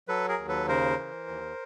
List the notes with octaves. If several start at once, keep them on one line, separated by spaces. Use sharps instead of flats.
F#3 A4 B4
G#4 A#4
D#2
A4 B4
C#3 A#4 C5
E3
D#2